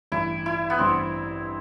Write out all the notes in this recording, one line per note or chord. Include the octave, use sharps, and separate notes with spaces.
A1 G2 E3 E4
E4
B3
A1 G2 E3 C4